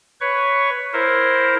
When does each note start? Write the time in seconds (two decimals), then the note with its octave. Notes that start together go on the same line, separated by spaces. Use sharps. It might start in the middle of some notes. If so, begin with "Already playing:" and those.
0.21 B4 C#5 C#6
0.93 E4 A#4 C5